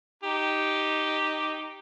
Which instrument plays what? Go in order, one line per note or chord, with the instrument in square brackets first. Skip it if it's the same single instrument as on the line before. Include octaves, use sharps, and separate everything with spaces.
[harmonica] D#4 G4